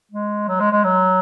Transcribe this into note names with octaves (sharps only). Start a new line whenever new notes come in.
G#3
F#3
G#3
G#3
F#3